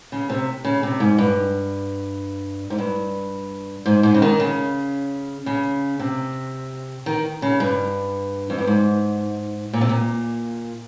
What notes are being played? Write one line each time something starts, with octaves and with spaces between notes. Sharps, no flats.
C#3
C3
C#3
C3
G#2
G2
G#2
G2
G#2
G#2
C#3
D#3
C#3
C#3
C3
D#3
C#3
G2
F2
G2
G#2
A#2
C3
A#2